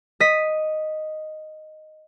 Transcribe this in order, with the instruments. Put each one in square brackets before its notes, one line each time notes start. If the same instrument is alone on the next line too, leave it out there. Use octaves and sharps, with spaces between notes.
[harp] D#5 B6